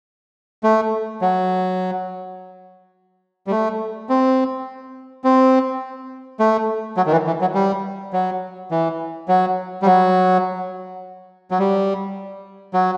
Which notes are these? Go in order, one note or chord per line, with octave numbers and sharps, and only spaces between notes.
A3
F#3
G3
A3
C4
C4
A3
F#3
D#3
E3
E3
F#3
G3
F#3
E3
F#3
G3
F#3
F#3
G3
F#3